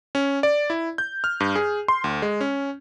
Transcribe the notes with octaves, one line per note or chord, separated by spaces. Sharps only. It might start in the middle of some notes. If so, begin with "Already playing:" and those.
C#4
D5
E4
G6
F6
G2
G#4
C6
D2
G#3
C#4